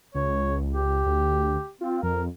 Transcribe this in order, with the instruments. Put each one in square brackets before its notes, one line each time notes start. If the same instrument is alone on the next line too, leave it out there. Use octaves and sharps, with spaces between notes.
[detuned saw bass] C#2 [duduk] C#5
[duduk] G4
[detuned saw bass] D2
[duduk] C4 [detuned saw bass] F4
[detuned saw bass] F2 [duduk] A#4